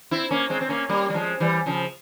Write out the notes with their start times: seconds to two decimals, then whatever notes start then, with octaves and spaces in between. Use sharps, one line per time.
0.11 C4 E4
0.31 A#3 C#4
0.50 G#3 C4
0.61 C4
0.69 A#3 C#4
0.89 G3 A#3
1.10 G3
1.14 F3 G#3
1.40 E3 G3
1.66 C#3 F3